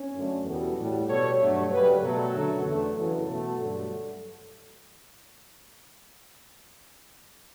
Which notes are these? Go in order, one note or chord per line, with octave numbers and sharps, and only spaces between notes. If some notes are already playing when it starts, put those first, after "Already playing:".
Already playing: C#4
F#2 D3 A3
E2 B2 G3 F#4 A4
A2 G3
B2 G3 A4 C#5
G2 F#3 A3
F#2 C#3 G3 G4 B4
B2 F#3 A3 F#4 A4
F#2 D3 F#3 A3
E2 D3 A3
F#2 C#3 E3 F#4 A4
B2 A3
G2 D3 F#3 A3